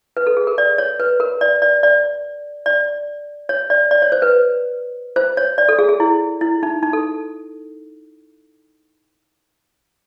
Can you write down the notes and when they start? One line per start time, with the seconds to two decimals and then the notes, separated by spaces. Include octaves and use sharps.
0.17 B4
0.27 A4
0.37 G#4
0.47 A#4
0.58 D5
0.78 C#5
1.00 B4
1.20 A#4
1.41 D5
1.62 D5
1.83 D5
2.66 D5
3.49 C#5
3.70 D5
3.91 D5
4.02 C#5
4.12 C5
4.22 B4
5.16 C5
5.37 C#5
5.58 D5
5.69 A4
5.79 G#4
5.89 G#4
6.00 E4
6.41 E4
6.63 D#4
6.83 D#4
6.93 A4